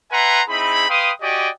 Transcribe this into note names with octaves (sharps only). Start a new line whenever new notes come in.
B4 E5 F#5 G#5 A#5 C6
C4 D#4 E4 G#4 B5
B4 F5 G5 C6 D#6
F#4 G4 D5 D#5 G5 G#5